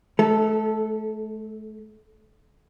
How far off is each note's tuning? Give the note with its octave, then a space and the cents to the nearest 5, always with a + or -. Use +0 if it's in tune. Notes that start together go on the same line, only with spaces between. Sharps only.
A3 -35 A4 +0